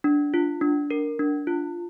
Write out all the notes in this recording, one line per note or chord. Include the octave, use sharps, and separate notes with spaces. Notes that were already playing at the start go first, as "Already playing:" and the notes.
D4
F4
D4
A#4
D4
F4